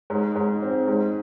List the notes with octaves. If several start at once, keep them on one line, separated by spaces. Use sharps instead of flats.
G#2
G#2
C4
G#2